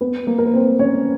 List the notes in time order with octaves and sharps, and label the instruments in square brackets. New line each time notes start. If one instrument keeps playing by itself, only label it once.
[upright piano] B3 B4
A#3 A#4
A#4
B4
C4 C5
C#4 C#5